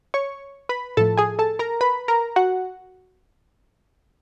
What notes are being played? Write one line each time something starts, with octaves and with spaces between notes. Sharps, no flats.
C#5 C#6
B4 B5
A2 F3 A3 A4 A5
G#4 G#5
A4 A5
A#4 A#5
B4 B5
A#4 A#5
F#4 F#5